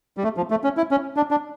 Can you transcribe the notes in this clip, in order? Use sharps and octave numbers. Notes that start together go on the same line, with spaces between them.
G3
A3
F3
A3
C#4
E4
C#4
D4
D4